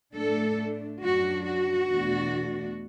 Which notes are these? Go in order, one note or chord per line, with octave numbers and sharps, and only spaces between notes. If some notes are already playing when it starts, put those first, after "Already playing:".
A2 A3 D4 A4
F#2 F#3 D4 F#4
F#4
E2 B2 A3 D4